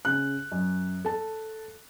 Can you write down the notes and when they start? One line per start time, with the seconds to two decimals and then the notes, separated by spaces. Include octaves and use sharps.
0.05 C#3 F#6
0.52 F#2
1.05 A4 A5